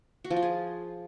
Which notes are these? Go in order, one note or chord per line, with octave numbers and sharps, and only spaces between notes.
F#4
F3
F4
G#4